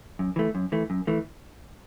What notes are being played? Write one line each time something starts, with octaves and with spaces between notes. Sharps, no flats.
F#2
E3 A3
F#2
E3 A3
F#2
E3 A3